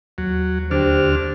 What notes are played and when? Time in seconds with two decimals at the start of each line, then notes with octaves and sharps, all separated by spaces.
0.18 D#2 F#3
0.71 D2 D4 G4 C5 F6